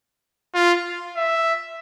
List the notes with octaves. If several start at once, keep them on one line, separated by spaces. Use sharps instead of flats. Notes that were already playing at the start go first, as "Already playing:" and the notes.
F4
E5